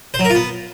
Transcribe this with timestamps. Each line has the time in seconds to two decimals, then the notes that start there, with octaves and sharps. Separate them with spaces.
0.14 C5
0.19 F#3
0.25 A#4
0.30 F4
0.35 B3